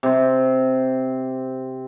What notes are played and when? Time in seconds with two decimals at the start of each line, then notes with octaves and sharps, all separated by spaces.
0.03 C3 C5